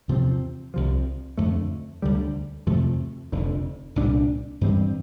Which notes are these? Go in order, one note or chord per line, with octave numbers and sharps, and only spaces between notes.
E2 C3 F3 C4
C2 C3 F3
F2 D3 A3
D2 D3 G3
F2 C3 F3 A3
F1 F2 D3
C2 A#2 G3 D4
G2 E3 G3 C4